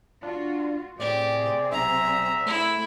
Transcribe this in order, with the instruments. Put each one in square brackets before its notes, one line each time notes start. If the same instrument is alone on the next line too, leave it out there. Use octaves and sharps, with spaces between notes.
[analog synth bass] D4 [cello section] F4 F#4
[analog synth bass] A2 [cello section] C3 C4 G#4 [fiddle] G4 [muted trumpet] D5
[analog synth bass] B1 [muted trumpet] E5 [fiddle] A#5
[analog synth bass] A3 [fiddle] E4